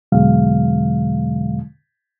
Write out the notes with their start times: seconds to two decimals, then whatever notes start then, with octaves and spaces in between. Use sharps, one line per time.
0.12 E2 B2 D3 F#3 G#3 F5